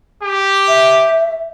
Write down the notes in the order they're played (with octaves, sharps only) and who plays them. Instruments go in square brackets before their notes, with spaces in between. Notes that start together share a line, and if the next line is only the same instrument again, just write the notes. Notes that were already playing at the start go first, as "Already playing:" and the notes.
[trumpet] G4
[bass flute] E5